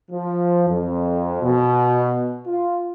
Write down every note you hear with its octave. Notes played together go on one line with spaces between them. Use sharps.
F3
F2
B2
F4